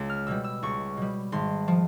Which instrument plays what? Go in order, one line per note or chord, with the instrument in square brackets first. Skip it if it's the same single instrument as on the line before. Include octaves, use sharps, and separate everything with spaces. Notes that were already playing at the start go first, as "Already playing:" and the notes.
Already playing: [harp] C#2
F6
B2 G3 E6
E6
C#2 C#6
B2 G3
G#1 C6
F3